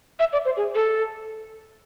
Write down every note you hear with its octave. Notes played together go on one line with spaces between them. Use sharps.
E5
D5
C5
G#4
A4